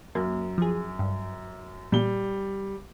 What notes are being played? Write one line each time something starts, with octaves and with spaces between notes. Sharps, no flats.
F#2 A#3
F3 G#4
G2
A#2 G3 G7